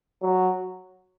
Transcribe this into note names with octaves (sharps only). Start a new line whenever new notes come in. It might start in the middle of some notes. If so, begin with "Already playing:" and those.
F#3